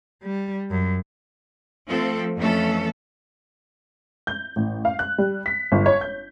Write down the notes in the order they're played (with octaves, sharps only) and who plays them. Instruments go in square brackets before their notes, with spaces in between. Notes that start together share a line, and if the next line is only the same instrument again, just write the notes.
[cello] G3
F#2
[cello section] F3 A3 C4 A4
F2 E3 A3 C#4 A4
[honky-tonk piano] G6
A1
F5
F#6
G3
B6
G1
C#5
G6